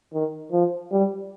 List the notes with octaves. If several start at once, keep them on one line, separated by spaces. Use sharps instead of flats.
D#3
F3
G3